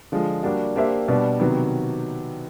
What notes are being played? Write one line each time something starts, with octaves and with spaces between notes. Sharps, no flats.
D3 F3 G#3
G3 A#3 D4 F#4
A#3 D4 G4 C5 E5
B2 G3 B3 D4
C3 D#3 F#3 B3